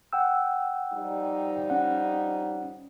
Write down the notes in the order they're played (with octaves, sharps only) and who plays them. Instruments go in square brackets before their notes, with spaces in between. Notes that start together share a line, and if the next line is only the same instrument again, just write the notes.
[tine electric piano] F#5 G5 E6
[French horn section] F3 G3 D#4
[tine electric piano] C#4 F#5